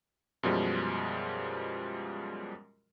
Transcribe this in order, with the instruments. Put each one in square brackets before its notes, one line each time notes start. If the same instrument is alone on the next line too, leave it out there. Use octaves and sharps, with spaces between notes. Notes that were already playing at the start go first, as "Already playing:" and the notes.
[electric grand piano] F#2 B2 F3 G3 G#3